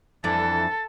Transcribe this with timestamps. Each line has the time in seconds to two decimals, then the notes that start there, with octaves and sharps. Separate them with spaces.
0.24 F2 E3 D4 A4 A6